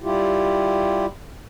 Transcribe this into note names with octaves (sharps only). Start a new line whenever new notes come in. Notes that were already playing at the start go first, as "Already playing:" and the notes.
G3 E4 F4 G4